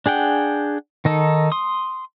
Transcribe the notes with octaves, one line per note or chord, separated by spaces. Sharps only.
D4 G#4 F#5 G5
D#3 D#4 A4
C6 D#6